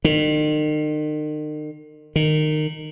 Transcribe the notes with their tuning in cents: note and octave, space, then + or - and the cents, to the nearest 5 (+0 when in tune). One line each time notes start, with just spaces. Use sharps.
D#3 -40
D#3 -20